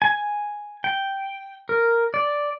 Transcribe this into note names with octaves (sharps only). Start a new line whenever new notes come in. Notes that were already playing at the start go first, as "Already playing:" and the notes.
G#5
G5
A#4
D5